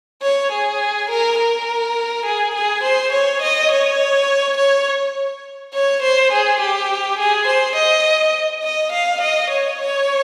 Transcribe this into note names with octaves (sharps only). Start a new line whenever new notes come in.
C#5
G#4
A#4
A#4
G#4
G#4
C5
C#5
D#5
C#5
C#5
C#5
C5
G#4
G4
G#4
C5
D#5
D#5
F5
D#5
C#5
C#5